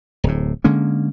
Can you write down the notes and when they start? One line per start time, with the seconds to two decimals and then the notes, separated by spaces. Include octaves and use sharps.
0.24 D1 A2
0.64 D3 G#3 A#3 C#4